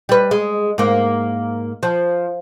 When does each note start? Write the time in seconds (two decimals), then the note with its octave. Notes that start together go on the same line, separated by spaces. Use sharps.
0.09 G3 B4
0.31 G#3
0.78 G#2 A#3
1.83 F3